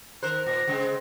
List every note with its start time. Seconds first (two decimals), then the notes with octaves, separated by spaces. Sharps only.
0.23 D#3 A#4 C5 F#6
0.46 A#2 A#6
0.68 C#3 G#3 C4